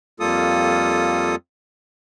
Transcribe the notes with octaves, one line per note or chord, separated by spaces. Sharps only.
F2 G3 A#3 F4 A4 D#6